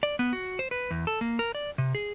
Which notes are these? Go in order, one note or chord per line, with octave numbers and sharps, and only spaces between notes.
D5
B3
F#4
C5
B4
E2
A4
A#3
A#4
D5
C3
G#4